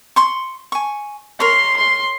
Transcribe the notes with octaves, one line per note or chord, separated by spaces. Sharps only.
C6 C#6
G#5 C#6
A#4 C#5 C6
C6